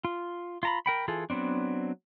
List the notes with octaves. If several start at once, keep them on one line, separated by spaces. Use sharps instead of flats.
F4
F4 A#5 B5
A#4 G5 B5
E3 F4 G#4 A4
F#3 B3 C4 D4